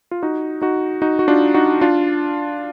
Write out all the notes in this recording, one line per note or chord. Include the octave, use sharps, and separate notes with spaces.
F4
D#4 F#4
D#4 F#4
D#4 F#4
F#4
D4 F4
D#4 F#4
D4 F4